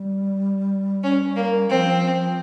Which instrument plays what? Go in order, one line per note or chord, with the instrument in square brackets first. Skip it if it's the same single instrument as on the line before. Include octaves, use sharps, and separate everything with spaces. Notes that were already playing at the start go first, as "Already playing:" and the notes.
Already playing: [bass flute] G3
[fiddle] C#4
A#3
[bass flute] F3 [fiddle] C4